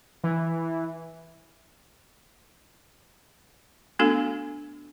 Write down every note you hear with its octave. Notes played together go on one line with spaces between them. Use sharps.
E3
A3 B3 D4 F#4 A4 F5